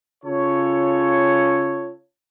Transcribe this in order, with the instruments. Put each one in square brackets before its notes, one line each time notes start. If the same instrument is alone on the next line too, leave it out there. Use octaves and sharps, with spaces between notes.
[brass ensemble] C#3 F4 A4 C#5